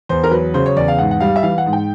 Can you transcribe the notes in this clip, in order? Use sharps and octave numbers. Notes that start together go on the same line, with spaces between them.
E2 C5
A#4
F#3 B4
C#3 C5
C#5
E2 D5
F5
G#2 F#5
F#5
G3 F5
E5
E3 F5
F#5
G#2
G5